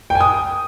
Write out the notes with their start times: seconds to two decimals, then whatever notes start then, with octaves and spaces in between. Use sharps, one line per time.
0.10 G5
0.15 G#5
0.20 D#6